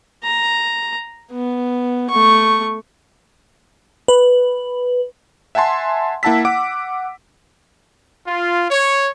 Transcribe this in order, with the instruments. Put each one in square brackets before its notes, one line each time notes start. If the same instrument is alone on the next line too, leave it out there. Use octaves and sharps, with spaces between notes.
[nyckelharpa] A#5
B3
A3 C#6
[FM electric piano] B4
[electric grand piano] E5 F#5 G#5 A5 C6
A#3 E4 F#5 A5 E6 B6
F#5 D6 D7
[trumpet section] F4
C#5